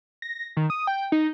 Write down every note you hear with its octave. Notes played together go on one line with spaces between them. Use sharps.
A#6
D#3
D#6
G5
D#4